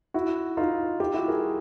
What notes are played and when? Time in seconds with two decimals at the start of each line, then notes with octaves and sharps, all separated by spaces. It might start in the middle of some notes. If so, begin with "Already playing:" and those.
0.14 E4 F#4
0.57 D#4 F4
1.00 F4 G4
1.14 E4 F#4
1.28 G#4 A#4